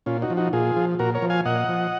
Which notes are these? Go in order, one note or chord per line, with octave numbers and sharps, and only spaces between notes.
A#2 C#4 F4
D#4 F#4
F3
D#4 F#4
A#2 F4 G#4
F3
A#2 F#4 A#4
A#4 C#5
F3
F5 G#5
A#2 D#5 F#5
F3